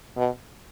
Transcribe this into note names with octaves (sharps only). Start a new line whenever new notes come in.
B2